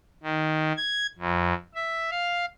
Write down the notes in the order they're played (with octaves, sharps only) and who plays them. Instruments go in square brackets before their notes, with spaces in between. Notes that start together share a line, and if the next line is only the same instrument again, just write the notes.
[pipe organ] D#3
G#6
F2
E5
F5